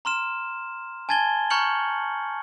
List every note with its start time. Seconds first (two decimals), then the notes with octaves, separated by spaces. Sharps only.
0.05 A#5 C6 F6 E7
1.09 G#5 A5 G#6 A6 G7
1.50 A#5 C#6 F6 G6 C#7 F#7